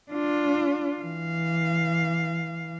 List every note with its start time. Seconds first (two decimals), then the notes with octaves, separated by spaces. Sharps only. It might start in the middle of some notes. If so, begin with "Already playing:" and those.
0.12 D4 F4
1.00 E3 F5